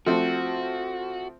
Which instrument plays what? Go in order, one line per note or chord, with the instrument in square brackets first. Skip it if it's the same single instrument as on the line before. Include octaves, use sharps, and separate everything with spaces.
[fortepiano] F3 A3 C4 [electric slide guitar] F#4